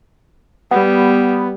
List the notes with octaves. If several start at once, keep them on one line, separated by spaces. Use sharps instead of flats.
G3 B3